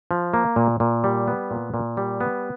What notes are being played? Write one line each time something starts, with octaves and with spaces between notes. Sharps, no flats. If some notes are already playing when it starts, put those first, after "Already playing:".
F3
A#3
A#2
A#2
G3
B3
A#2
A#2
G3
B3